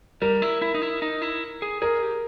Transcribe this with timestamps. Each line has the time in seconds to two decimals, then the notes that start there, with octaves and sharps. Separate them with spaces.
0.22 G3 A#4
0.42 E4
0.62 E4
0.74 D#4
0.82 E4
1.02 D#4
1.22 E4
1.62 G#4
1.82 G#4 A#4
2.02 G4